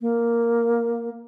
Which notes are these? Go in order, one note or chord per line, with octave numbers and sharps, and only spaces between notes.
A#3